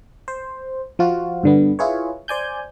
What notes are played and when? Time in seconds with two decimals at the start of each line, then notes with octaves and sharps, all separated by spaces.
0.28 C5
0.99 F3 F4 F#4
1.43 G2 D3 B3
1.79 E4 F4 G#4 B4 C#5
2.28 C5 D5 G#5 G6